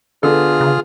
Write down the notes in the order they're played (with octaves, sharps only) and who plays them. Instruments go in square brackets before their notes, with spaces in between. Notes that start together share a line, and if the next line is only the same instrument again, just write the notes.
[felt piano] D3 B3 [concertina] F4 G#4 F6 [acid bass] A4
[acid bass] C#3